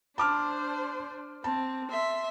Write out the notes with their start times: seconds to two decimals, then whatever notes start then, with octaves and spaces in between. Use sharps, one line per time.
0.18 D4 C5 A5 D6 F6
1.44 C4 A5
1.90 E5 C6